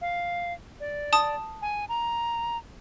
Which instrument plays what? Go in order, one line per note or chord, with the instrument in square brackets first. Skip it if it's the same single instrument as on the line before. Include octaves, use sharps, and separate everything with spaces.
[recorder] F5
D5
[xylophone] A5 D#6
[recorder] G#5
A#5